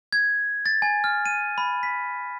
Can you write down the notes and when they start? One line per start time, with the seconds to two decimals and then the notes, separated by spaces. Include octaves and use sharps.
0.13 G#6
0.66 A6
0.82 G#5
1.04 F6
1.26 D#7
1.58 B5
1.83 B6